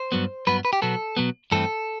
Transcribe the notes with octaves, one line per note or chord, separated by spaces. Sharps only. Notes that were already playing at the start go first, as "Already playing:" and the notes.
Already playing: C5
G2 F#3 B3
G2 F#3 B3 B4
B4
G4
B2 F#3 B3 A4
B2 F#3 B3
G2 E3 A3 C4 A4